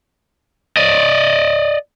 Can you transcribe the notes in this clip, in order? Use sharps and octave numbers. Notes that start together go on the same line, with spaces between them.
D5 D#5